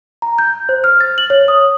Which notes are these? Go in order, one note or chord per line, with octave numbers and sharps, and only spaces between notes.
A#5
G6
C5
F6
A6
F#7
C#5
D#6